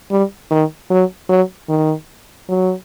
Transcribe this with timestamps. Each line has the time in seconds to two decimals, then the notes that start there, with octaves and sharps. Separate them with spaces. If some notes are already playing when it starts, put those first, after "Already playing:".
0.11 G3
0.51 D#3
0.90 F#3
1.29 F#3
1.69 D#3
2.48 F#3